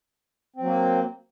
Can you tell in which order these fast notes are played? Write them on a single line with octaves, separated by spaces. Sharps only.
C4 F#3 A#3